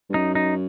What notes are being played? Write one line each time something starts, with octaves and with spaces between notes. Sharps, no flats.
G2
F#2 D#4
D#4